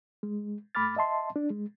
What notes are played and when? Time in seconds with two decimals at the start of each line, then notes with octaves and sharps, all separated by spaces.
0.23 G#3
0.75 G2 A3 B5 D6 F6 A6
0.96 D#5 E5 A5 C6
1.36 D4
1.50 G#3